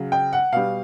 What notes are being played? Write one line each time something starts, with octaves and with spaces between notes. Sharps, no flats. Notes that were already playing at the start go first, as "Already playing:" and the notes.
Already playing: C#3 F#3
G5
F#5
B2 G3 F5